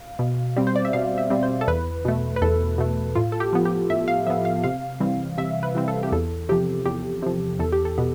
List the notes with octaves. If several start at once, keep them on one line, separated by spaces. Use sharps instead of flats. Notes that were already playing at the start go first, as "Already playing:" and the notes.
Already playing: F5
B2
G3 C4
C5
D5
E5
B2 F5
E5
G3 C4
C5
A4
E2 B4
B2 A3
B4
E2 A4
B2 A3
A2 F4
A4
G4
F3 B3
G4
A2 E5
F5
F3 B3 E5
F5
C3 F5
E3 G3 C4
C3 E5
B4
E3 G3 C4
A4
G4
E2 A4
C3 F3 G4
E2 G4
C3 F3
E2 A4
G4
A4
B2 B3